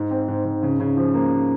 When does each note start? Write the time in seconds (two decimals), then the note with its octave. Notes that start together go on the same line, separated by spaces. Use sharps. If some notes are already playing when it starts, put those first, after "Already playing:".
Already playing: G#2
0.11 C4
0.28 G#2
0.45 G#2
0.63 C#3
0.80 C#3
0.97 F3
1.14 A#3